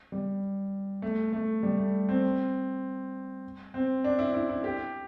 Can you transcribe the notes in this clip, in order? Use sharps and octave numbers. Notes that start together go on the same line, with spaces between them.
G3
A3
A3
G3
A3
C4
C4
D4
E4
E4
E4
G4